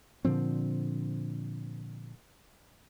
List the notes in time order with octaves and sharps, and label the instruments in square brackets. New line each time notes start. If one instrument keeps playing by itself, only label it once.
[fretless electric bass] A#2 D3 F3 C4